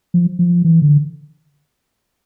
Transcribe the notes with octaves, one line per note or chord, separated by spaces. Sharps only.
F3
F3
E3
D3